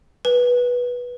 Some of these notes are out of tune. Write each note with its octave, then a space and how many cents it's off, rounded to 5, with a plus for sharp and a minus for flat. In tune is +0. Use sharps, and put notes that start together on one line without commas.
B4 -10